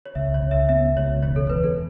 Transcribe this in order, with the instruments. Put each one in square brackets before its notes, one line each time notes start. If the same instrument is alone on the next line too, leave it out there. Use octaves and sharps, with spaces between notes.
[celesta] C#5
[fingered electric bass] C#2 [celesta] E5
[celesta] C#5
[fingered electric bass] C#2
[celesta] E5
[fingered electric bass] B3 [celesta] E5
[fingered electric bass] C#2 [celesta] C#5
[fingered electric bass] E1 [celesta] C#5
[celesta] A4
[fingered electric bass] E2 [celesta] B4
[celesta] A4